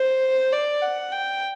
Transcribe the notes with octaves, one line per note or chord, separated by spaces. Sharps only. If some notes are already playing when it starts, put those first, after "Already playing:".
Already playing: C5
D5
F#5
G5